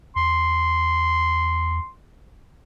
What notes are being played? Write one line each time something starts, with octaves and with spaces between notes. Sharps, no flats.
E2 C6